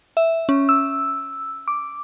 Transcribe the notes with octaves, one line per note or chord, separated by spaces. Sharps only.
E5
C#4
E6
D6